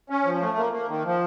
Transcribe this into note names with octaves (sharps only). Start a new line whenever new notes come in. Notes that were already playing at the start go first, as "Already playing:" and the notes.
C#4
F3
A3
A#3
A#3
D#3
F3